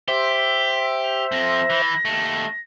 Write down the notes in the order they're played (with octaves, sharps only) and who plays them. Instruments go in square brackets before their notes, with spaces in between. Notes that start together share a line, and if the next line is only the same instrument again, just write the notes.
[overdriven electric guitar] G4 [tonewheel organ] C5 E5 [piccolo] B6
[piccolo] F7
[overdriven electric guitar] F2 C4 [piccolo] A#6
[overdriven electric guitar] E3
D#2 A3